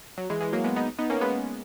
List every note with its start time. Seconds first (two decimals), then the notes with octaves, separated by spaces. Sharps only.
0.18 F#3
0.30 E3 G#3
0.41 E3 G#3
0.53 F#3 A#3
0.64 G#3 B3
0.76 B3 D#4
0.98 B3 D#4
1.10 A#3 C#4
1.21 G#3 B3